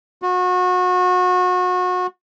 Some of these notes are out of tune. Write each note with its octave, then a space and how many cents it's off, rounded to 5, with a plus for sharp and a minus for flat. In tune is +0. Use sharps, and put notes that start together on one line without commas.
F#4 -30